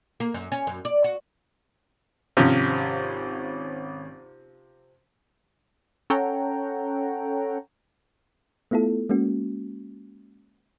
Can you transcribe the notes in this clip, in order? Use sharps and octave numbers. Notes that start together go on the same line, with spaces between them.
A#3
F#2
C#4
F#2
D5
F#4
G#1 C3 F3 C#4
C#4 A4 C#5 F#5 G5 A#5
A3 B3 E4 F4 A4
G#3 A#3 C#4 F#4